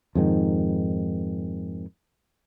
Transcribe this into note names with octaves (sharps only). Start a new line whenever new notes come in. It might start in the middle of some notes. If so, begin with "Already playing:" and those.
F2 G#2 D#3